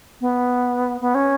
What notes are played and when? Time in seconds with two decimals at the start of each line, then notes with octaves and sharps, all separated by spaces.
0.21 B3
1.01 B3
1.15 C#4